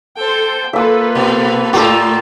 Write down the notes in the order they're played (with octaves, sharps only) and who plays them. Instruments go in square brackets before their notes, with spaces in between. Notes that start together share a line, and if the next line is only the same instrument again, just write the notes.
[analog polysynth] A4 C5 [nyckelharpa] G5
[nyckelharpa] A#3 F4 [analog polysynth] A4 B4 [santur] E5 E6
[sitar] B2
[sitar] A2 F4 [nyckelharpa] A3 [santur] G4 A#4 E6